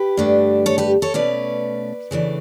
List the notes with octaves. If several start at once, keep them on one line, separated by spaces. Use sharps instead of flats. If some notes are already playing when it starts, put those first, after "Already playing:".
Already playing: G4 B4
G2 D3 A3 D4
A4 C#5
G4 B4
A4 C#5
B2 A3 C#4 B4 D5
C#3 E3 A3 D4